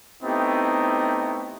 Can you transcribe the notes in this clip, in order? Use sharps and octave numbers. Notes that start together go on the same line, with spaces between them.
A3 B3 C4 D#4 E4 G4